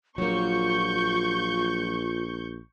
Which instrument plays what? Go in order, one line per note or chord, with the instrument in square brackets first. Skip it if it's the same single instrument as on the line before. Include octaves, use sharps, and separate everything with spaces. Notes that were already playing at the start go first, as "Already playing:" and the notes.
[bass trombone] A#1 [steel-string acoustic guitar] F#3 A#3 [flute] F4 [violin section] C#6 G6